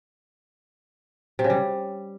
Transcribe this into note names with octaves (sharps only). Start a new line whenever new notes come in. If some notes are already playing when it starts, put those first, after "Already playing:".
C3
C#3
G3